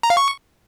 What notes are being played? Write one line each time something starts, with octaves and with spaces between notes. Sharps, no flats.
A#5
F5
C#6